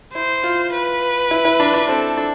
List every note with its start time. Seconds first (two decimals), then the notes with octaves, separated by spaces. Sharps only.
0.14 E4 C5
0.43 F4
0.73 B4
1.31 E4
1.45 E4
1.60 D4
1.74 D4
1.89 C4 A4
2.17 D4